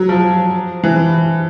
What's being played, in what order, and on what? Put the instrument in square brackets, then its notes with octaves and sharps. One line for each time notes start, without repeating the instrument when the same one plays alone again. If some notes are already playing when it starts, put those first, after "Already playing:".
Already playing: [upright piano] F#3
F3
E3